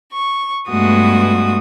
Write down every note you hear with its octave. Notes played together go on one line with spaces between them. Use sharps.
C#6
G2 G#3 A3 B3 F#4 D#6